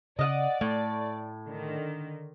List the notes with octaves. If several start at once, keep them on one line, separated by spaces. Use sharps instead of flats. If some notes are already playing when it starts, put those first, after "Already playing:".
C#3 D5 D#5 F5 F#5
A2 A3
D3 D#3